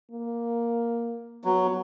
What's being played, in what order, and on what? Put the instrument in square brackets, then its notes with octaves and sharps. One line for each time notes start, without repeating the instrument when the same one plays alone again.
[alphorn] A#3
[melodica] F#3 [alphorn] B3